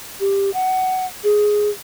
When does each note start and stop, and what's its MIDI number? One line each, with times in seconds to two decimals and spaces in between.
0.20 0.52 67
0.53 1.06 78
1.23 1.69 68